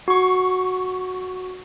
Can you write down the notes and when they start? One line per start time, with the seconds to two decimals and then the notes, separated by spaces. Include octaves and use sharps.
0.08 F#4 C#6